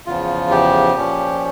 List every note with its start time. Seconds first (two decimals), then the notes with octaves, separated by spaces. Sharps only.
0.07 E2 C#3 F3 F4
0.51 G4
0.95 A#2 F3 C#4